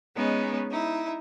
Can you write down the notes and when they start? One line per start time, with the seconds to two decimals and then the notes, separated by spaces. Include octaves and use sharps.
0.16 G#3 B3 C#4 D#4
0.69 D#4 E4